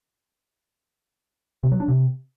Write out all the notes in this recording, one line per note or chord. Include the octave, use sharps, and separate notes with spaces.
C3
F#3
D4
C3